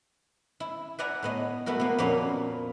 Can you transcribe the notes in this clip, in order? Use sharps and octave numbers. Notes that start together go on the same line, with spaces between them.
E4
B4 D5 E5 F#5 G#5 A#5
A2 B3 D#5
A3 B3 E4 F#4 A#4
A#3 B3
F2 A#2 A#3 B3 C#4